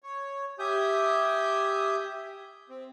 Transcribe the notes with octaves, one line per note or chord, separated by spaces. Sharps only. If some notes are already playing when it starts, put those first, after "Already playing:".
C#5
G4 E5 G#5 D#6 G6
C4